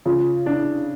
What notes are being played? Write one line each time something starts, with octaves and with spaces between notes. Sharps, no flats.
C#3 F4
D4 E4